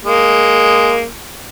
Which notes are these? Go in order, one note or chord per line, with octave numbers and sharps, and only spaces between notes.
G#3 A#3